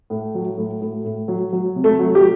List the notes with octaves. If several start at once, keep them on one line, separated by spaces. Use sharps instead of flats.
A2
F#3
A2
A2
A2
F#3
F#3
C3
A3
F#3
G4